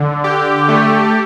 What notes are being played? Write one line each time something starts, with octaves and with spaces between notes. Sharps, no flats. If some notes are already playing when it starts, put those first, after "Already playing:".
Already playing: D3
G4
A3